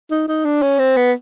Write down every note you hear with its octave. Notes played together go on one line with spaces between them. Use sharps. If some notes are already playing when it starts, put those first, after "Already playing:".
D#4
D#4
D4
C#4
C4
B3